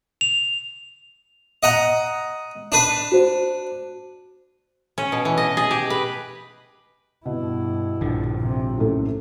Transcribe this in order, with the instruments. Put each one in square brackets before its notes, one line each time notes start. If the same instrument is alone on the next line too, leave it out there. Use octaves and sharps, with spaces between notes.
[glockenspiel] F7
[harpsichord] D#5 F#5 A#5
D4 B4
[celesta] F#4 C5
[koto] C#4
B2
E3
D#5
G#4
G4
B4
[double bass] G2 E4 [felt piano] B2
[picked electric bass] A#1 D3 F3 [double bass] G2
[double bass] G#2 C3
[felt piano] F#2 A2 A3